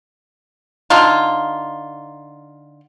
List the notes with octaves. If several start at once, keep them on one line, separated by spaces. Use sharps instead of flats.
D3 D#4 F4